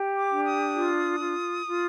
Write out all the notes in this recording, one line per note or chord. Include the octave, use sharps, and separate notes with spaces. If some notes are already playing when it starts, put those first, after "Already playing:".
Already playing: G4
D6
D4
D#6
F4
F4
F4